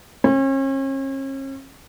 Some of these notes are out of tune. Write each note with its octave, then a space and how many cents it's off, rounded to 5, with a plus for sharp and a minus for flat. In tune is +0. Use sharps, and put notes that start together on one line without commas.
C#4 -40